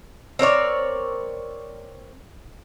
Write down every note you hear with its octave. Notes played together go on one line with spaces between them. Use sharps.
C4 A#4 C#5 D5